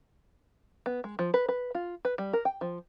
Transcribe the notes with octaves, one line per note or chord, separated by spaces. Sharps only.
B3
G#3
F3
B4
B4
F4
B4
G3
A#4
G5
F3